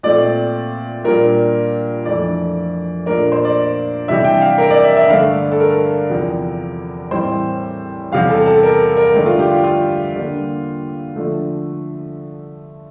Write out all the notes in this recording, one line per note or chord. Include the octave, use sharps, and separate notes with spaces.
A#2 A3 C4 D5
A#2 G3 D4 A#4
F2 E3 A3 D4 D5
A#2 A3 D4 A#4
C5
D5
C3 E3 G3 D4 E5
G5
F5
A#4
D5
E5
E5
G2 D3 A3 D4 F5
A4
A#4
E2 C3 F3
A2 E3 G3 C4 C5
E2 C3 G3 F5
A4
A4
A#4
A#4
G2 D3 A3 D4
F4
G4
F4
F4
D3 G3 A#3
D3 F3 A3